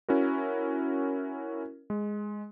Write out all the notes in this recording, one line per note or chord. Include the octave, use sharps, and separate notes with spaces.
C#4 E4 F#4 A#4
G#3